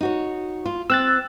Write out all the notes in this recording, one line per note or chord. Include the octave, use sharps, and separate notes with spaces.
D#4 F#4 C#5
F4
C4 E6 F#6 A6